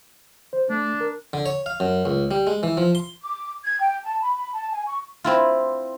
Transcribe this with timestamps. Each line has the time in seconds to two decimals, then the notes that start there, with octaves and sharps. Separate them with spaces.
0.53 C5
0.70 A3 D4
1.01 A#4
1.33 D3
1.46 C#5
1.66 F5
1.80 F#2
2.05 C#2
2.31 G3
2.47 G#3
2.63 E3
2.77 F3
2.95 C6
3.23 D6
3.64 G#6
3.80 G5
4.03 A5
4.21 B5
4.53 A5
4.71 G#5
4.86 C#6
5.24 C4 E4 F4